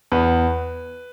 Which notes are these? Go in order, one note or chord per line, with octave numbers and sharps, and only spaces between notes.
E2 B4